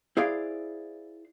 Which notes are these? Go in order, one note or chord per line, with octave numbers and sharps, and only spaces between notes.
E4 G#4 C5 D5 F5